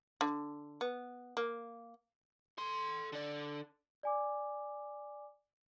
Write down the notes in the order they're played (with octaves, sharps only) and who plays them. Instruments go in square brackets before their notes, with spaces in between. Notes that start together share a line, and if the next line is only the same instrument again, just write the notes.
[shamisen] D3
B3
A#3
[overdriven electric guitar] A4 C6
D3 D5
[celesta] D5 G#5 D6